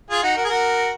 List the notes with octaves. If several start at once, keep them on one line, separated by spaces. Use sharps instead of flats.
F4 G#4
D#4 F#4
F#4 A#4
G#4
F#4 A#4